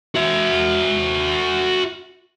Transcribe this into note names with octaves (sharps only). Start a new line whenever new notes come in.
F#4 E5